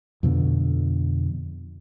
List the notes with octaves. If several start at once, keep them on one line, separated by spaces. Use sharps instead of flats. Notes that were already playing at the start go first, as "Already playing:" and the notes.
F2 B2 D3